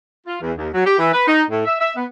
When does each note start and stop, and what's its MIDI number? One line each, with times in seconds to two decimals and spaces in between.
0.27 0.37 65
0.41 0.52 40
0.58 0.67 39
0.74 0.82 54
0.85 0.95 67
0.99 1.10 52
1.13 1.25 71
1.28 1.42 63
1.50 1.65 45
1.65 1.76 76
1.80 1.91 76
1.96 2.04 59